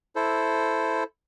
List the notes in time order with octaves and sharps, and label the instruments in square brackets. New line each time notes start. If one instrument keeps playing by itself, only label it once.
[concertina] E4 A4 C5